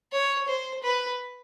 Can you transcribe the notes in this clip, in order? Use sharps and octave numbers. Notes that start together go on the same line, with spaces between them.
C#5
C5
B4